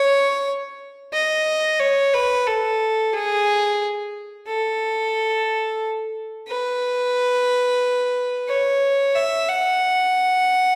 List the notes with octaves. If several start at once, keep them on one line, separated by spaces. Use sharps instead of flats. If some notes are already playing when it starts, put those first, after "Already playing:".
Already playing: C#5
D#5
C#5
B4
A4
G#4
A4
B4
C#5
E5
F#5